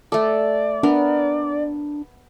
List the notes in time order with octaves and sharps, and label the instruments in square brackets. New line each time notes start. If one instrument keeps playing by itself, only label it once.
[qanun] A3 A4 [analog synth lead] D5
[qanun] B3 A#4 [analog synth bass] D4